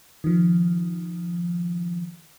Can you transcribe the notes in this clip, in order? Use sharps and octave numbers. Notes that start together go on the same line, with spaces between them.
D#3 F3